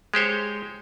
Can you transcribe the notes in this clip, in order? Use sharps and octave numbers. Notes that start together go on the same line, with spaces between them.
G#3 G4 C5 C#5